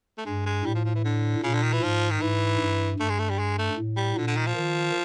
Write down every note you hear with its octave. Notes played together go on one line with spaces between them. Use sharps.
A3
G2 G#3
G#3
A2 G3
F3
F3
E3
D3
A#2 C#3
D3
D#3
E3
G#2 F3
D#3
G#2 E3
G2
G2 A3
G#3
A3
G3
G#3
A3
A2
G3
A#2 D3
D3
D#3
F3
D#3